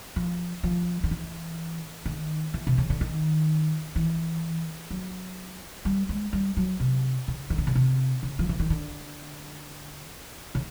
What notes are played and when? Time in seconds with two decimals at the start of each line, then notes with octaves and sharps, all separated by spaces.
0.16 F3
0.63 F3
1.04 D#3
1.11 E3
2.06 D#3
2.54 E3
2.67 C3
2.78 C#3
2.90 D3
3.01 D#3
3.96 E3
4.91 F#3
5.85 G3
6.09 G#3
6.33 G3
6.57 F#3
6.80 C3
7.28 C#3
7.50 D#3
7.58 D3
7.67 C#3
7.75 C3
8.23 C#3
8.39 F3
8.49 E3
8.59 D#3
8.70 D3
10.55 C#3